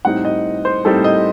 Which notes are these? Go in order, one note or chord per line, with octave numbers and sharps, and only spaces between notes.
A2 G3 C4 D#4 F#5
D#5
C5
A2 G3 C4 D#4 A4
D#5